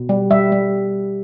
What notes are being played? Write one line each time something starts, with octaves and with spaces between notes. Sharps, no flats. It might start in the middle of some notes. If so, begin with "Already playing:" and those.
Already playing: B2
G3
G3 E5
G3